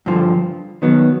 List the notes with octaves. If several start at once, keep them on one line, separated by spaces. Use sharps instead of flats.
G2 D3 F3
D#3 F#3 B3